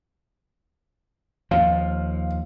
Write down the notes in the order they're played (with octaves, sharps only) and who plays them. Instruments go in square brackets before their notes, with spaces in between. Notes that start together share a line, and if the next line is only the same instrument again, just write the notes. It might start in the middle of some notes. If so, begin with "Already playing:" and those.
[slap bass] D#2 F3 [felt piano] F5